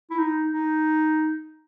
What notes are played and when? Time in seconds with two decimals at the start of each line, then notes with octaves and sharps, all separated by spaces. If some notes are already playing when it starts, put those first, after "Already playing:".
0.10 E4
0.18 D#4
0.53 D#4